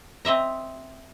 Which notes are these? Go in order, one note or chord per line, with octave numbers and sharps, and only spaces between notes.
C4 D#5 E5 A#5